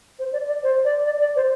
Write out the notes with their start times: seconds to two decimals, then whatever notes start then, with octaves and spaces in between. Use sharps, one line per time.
0.19 C5
0.33 D5
0.48 D5
0.63 C5
0.85 D5
1.06 D5
1.20 D5
1.36 C5